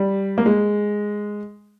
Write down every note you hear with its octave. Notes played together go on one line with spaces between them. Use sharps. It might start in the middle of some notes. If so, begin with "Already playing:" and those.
Already playing: G3
A#3
G#3